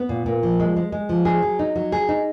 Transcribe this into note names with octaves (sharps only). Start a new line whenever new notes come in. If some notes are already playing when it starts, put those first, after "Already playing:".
Already playing: B3
A#2
A#2
F3
G#3
G#3
G#3
F3
G#4
F#3
D#4
F#3
G#4
D#4